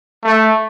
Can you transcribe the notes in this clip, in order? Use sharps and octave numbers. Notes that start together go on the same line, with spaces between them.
A3